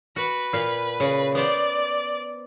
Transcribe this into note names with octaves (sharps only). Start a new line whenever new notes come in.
F#4 B4
A#2 F5
C#3
B3 C5 D5